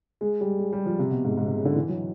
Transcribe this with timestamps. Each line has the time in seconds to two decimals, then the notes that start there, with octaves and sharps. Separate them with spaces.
0.21 G#3
0.41 G3
0.59 G#3
0.73 G3
0.86 F3
0.99 C3
1.11 B2
1.24 G#2
1.37 G#2
1.47 C3
1.56 C#3
1.65 D3
1.76 E3
1.89 F#3